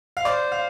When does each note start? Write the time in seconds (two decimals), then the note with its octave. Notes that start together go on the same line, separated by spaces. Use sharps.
0.17 F5
0.25 C5 D5
0.52 F5